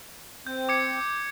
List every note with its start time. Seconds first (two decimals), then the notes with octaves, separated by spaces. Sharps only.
0.47 C4 G6
0.69 D6 G#6 C#7